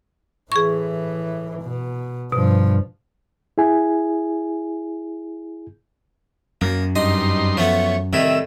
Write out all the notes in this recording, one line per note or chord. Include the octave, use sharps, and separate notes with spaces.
A2 E3 G#4 C#6
B2
G2 B2 F3
E4 G#4 G#5
F#2 F#3 A#3
G2 D#4 D#5 C6
F3 A3 B3 C#5
C2 A2 D#3 E4 E6